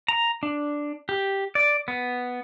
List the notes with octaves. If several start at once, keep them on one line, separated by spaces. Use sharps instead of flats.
A#5
D4
G4
D5
B3